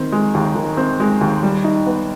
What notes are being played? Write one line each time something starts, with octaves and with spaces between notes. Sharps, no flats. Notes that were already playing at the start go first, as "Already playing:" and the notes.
Already playing: D#3 C4
G#3
D#2
D#3
C4
G#3
D#2
G3
D#4
B3